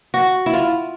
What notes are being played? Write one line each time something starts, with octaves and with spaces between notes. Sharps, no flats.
F#4
E4
F4